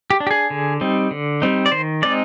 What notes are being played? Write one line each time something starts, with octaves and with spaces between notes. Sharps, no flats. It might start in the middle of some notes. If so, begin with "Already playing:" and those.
G4
D4
G4
G#4
D3
G3 C4 D#4
D3
G3 C4 D#4
D5
D#3 C5
G#3 C4 D#4 D5